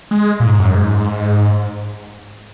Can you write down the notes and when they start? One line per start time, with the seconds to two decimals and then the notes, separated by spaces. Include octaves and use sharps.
0.11 G#3
0.40 A#2
0.46 G#2
0.60 F#2
0.75 G#2